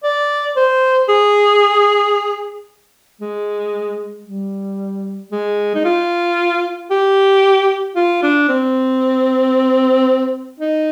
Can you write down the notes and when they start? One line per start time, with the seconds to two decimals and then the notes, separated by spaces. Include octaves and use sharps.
0.04 D5
0.56 C5
1.09 G#4
3.21 G#3
4.26 G3
5.31 G#3
5.75 D#4
5.85 F4
6.91 G4
7.96 F4
8.23 D4
8.49 C4
10.60 D#4